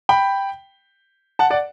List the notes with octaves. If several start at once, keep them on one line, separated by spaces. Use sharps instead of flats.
G5 B5
F#5 A5
D5 F#5